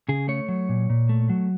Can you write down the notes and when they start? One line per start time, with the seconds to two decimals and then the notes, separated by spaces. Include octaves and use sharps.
0.09 C#3 G#4
0.28 A3 C#5
0.49 F#3
0.69 A#2
0.90 A#2
1.09 A3
1.30 F#3